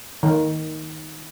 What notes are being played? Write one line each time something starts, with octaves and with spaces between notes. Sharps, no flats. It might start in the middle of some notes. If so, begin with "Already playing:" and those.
D#3